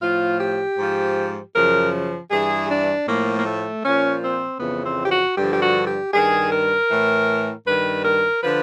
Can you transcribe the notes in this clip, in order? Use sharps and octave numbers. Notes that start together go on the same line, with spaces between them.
A2 F3 F4
G4
G#2 F3
F#2 C#3 F3 A#4
G2 E3 G#4
D4
A2 F3 A#3
A#3
A3
A#2 F3 C#4
C4
F2 C#3 E3 B3
C4
G4
F#4
G2 D3 F3 G4
G4
F#4
G4
G2 D#3 G#4
A#4
A2 E3
G2 D#3 B4
A#4
D3 F3 B4